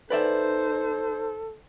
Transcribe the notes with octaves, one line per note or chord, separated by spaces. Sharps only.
D#4 A4 B4 C5 D5 E5